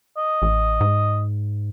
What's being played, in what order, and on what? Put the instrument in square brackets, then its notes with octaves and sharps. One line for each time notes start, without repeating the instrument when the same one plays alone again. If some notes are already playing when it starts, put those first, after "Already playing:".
[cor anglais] D#5
[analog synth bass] A1
G#2